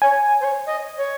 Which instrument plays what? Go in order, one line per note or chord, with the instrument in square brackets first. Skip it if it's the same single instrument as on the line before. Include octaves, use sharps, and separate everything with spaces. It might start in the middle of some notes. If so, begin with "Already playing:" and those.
[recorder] C#5 [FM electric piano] G#5
[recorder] C5
C#5
D#5
C#5